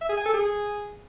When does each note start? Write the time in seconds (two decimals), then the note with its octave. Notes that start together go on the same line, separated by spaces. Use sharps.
0.01 E5
0.09 G#4
0.17 G#5
0.26 A4
0.34 G#4